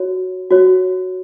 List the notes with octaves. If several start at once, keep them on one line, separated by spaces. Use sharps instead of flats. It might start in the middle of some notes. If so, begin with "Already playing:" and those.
Already playing: F#4 C#5
F#4 C#5